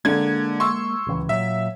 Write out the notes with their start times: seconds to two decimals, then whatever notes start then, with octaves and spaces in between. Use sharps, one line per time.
0.05 D3 G#3 A#3 G#6
0.60 C6 C#6 E6
1.07 D1 C#2 E3
1.29 A#2 F#3 E5